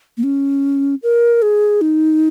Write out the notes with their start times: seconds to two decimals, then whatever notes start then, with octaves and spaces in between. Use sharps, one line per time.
0.17 A#3
0.23 C#4
1.03 A#4
1.42 G#4
1.81 D#4